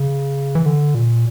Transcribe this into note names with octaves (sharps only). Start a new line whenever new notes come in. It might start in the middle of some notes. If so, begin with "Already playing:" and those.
Already playing: C#3
E3
D3
A#2